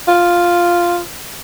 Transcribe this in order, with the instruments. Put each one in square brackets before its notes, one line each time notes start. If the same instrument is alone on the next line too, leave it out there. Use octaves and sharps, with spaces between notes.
[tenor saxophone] F4